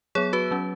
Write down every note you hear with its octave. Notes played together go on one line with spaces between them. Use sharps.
F#3 B3 G#4 C#5
F#4 B4
F#3 C#4